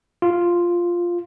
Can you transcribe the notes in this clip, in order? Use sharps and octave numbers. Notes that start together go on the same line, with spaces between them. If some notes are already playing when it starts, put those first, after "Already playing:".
F4